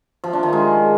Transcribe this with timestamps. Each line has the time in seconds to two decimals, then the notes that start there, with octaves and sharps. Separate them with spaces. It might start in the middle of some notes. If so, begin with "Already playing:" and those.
0.24 F3
0.33 D4
0.43 D#3
0.53 G#3